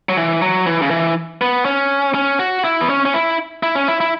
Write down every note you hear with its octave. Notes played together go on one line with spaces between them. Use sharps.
F#3
E3
F#3
E3
C#3
E3
B3
C#4
C#4
F#4
E4
B3
C#4
C#4
E4
E4
C#4
E4
E4